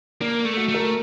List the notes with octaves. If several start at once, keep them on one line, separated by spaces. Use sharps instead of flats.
A#3 D4
A3
F#4
A3
A#4